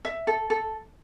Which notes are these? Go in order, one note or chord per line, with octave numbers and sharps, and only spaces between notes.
E5
A4
A4